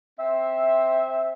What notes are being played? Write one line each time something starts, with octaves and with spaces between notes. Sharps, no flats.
C4 C5 E5